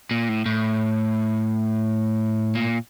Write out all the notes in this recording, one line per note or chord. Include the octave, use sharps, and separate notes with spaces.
A#2
A2
A2
A#2